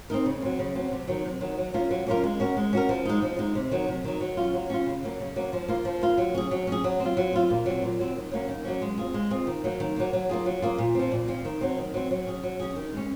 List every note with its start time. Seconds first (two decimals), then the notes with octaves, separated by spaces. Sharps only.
0.10 C4 D#4 A#4
0.26 C#3
0.42 F#3 C4
0.59 C#3
0.75 F#3 C4
0.91 C3
1.07 D#3 F#3
1.25 C3
1.41 D#3 F#3
1.58 F#3
1.74 A#3 C#4 F4 A#4
1.91 F#3
2.07 A#3 C#4 F4 A#4
2.23 G#3
2.40 C#4 F#4 A#4
2.57 G#3
2.73 C#4 F#4 A#4
2.89 F3
3.05 G#3 D#4
3.22 F3
3.39 G#3 D#4
3.55 C3
3.71 D#3 F#3
3.88 C3
4.04 D#3 F#3
4.21 F#3
4.37 C#4 F4
4.53 F#3
4.70 C#4 F4
4.86 C#3
5.03 F#3 A#3
5.20 C#3
5.36 F#3 A#3
5.53 F3
5.68 A#3 F4
5.85 F3
6.01 A#3 F4
6.18 F#3
6.35 C#4 G#4
6.51 F#3
6.67 C#4 G#4
6.84 F#3
7.00 C4
7.05 F4
7.17 F#3
7.33 C4 F4
7.50 A#2
7.66 F#3 C4
7.82 A#2
7.99 F#3 C4
8.15 D#3
8.31 F#3 A#3 C#4
8.48 D#3
8.64 F#3 A#3 C#4
8.82 G#3
8.98 C4 F4 G#4
9.14 G#3
9.31 C4 F4 G#4
9.47 D#3
9.64 F#3 A#3
9.80 D#3
9.96 F#3 A#3
10.13 F#3
10.29 A#3 F4 G#4
10.46 F#3
10.62 A#3 F4 G#4
10.78 A#2
10.95 F3 C4
11.12 A#2
11.28 F3 C4
11.45 D#3
11.61 F#3 C4
11.77 D#3
11.94 F#3 C4
12.11 F#3
12.27 C#4 G#4
12.43 F#3
12.60 C#4 G#4
12.76 D#3
12.92 G#3 C#4